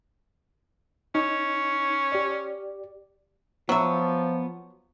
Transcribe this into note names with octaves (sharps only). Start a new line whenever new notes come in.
C#4 D#4
G4 D5
F3 F#3 B3 E5